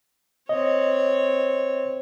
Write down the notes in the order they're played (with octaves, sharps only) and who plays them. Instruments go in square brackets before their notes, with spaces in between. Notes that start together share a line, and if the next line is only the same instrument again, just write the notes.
[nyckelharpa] C4 C#5 [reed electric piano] D#5